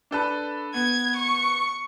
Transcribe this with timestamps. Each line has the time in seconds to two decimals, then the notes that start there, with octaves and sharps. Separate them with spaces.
0.11 D4 A4 B4
0.74 B3 G#6
1.17 C#6